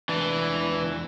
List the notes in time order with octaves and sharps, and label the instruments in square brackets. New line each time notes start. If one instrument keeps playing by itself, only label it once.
[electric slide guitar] E2 D4 [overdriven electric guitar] E3